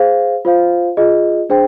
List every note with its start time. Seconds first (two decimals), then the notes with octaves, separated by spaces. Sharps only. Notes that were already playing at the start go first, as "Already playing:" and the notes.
Already playing: G#4 C5 F5
0.45 F4 C5 F5
0.97 F4 G#4 D#5
1.50 D4 G#4 C5 G5